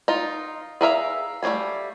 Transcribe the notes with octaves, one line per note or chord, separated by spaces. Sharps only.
D#4 F4
G#4 A#4 E5 F5
G3 A3 D4 F5 G#5